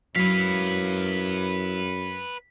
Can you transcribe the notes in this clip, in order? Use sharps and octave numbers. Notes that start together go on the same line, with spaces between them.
F#2 F#3 E4 B4 F5 B6